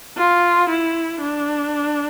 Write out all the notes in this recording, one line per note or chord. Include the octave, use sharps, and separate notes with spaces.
F4
E4
D4